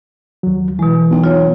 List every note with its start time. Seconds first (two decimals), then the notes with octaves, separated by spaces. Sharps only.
0.43 D#2 F#3
0.79 B2 E3 G#3
1.11 B1
1.24 F4 C#5